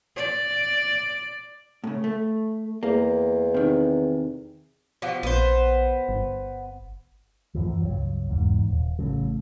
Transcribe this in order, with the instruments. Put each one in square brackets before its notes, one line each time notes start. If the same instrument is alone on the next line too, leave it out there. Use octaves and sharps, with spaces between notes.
[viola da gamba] D5
[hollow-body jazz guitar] A2 C#3
A3
[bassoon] E2 [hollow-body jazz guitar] A#3
[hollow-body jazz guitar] C3 D#3
[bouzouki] B2 F3 G4
[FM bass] A#1 [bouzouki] B3 C5
[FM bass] G1
[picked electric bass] F#2 E3 F3
C#2 G2 F#3
F#1 E2 G#2
D#1
A1 A2 C#3 F#3